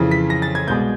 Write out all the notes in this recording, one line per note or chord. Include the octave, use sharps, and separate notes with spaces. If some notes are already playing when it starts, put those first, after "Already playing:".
Already playing: F2 C#3 E3
B6
A#6
A6
G#6
C2 B2 G#3 G6